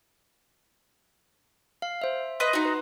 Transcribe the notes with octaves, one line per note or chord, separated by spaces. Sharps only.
F5
C5 E5
B4 D#5 C6
D#4 F#4
B4